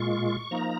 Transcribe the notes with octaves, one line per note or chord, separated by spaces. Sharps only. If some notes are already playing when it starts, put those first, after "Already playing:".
Already playing: A#2 G#3 F4 C#6
F3 A#3 D#4 A#5